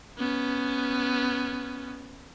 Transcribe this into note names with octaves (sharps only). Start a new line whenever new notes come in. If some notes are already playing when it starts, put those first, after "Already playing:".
B3 C#4